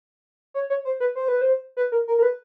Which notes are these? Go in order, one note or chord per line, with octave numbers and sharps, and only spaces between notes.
C#5
C#5
C5
B4
C5
B4
C5
B4
A#4
A#4
A#4
B4